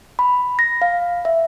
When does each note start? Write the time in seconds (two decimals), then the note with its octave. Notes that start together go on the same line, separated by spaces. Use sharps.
0.19 B5
0.59 A#6
0.82 F5
1.25 E5